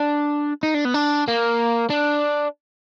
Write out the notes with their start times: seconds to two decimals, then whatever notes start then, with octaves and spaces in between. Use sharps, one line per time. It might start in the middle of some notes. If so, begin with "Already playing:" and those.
Already playing: D4
0.63 D#4
0.74 D4
0.85 B3
0.94 D4
1.28 A#3
1.90 D4